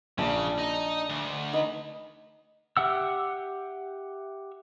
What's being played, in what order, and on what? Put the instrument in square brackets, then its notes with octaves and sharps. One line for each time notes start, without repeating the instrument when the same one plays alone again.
[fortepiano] A#1 [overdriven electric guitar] C#3 [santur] D4
[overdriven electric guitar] D#4
D2
[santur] D#4 B4
[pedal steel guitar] G4 E5 F#5 E6